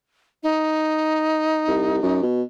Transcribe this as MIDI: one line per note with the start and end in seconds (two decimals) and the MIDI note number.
0.43 2.23 63
1.68 2.02 36
2.03 2.19 42
2.23 2.42 47